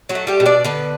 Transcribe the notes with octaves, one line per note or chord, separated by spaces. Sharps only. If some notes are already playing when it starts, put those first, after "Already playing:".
F#3 F#4
A3
G3 G4
B2
D4 D5
D3 B3 B4